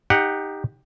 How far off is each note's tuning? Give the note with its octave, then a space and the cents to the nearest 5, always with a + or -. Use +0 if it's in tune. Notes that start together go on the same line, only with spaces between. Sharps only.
D#4 +0 G4 +15 F#5 +0